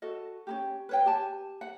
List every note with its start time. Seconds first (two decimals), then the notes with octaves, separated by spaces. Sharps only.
0.02 F#4 A4 D#5
0.47 C#4 D#4 G4
0.89 B4 C#5 G5
1.06 G4 G#5 A5
1.61 F#5